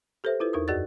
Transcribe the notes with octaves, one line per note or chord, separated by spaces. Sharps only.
G4 A4 B4 C5 E5
E4 F4 A4 B4
E2 D#4 A#4 D#6
F#2 F#4 G#4 D5 D#5 A6